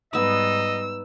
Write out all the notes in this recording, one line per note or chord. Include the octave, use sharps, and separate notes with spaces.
G#2 G3 B3 D#4 D#5 E6